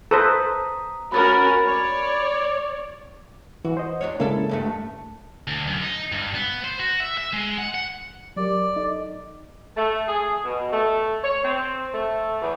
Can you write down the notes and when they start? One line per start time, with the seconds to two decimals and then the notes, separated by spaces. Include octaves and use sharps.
0.11 A4 B4 C5 A#5 D#6 B6
1.12 C#4 F#4 A#4 B5 A6
1.68 C#5 D5
3.65 E3 F#4
3.77 C5 D#5
4.01 E2 D4 C#5
4.20 C#3 G#3 A#3 E4 A4
4.49 E2 G2 A3
5.47 D2
5.67 F#2
5.82 D#4
6.12 G2
6.35 B3
6.64 C5
6.80 F#4
7.00 E5
7.17 E5
7.33 G#3
7.58 F#5
7.74 F#5
8.36 F#3 G4 A#4 D5
8.76 D#4 A4 D#5
9.77 A3
10.08 G#4
10.44 B2
10.72 A3
11.23 C#5
11.44 C4
11.94 A3
12.42 E2